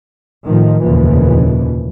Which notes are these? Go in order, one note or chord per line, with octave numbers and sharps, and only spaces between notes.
A2 D#3 F3
F1 D#2 A#2 C#3 E3 F3